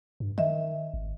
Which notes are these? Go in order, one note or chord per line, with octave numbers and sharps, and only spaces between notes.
G2
D#3 D#5 E5
G#1